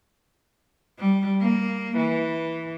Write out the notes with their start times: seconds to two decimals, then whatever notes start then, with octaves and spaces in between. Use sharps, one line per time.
0.99 G3
1.41 A#3
1.97 E3